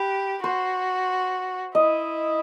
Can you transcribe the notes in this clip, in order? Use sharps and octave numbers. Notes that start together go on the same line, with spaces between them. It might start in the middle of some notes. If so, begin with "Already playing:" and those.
Already playing: G4 B4
F#4 C5
E4 D#5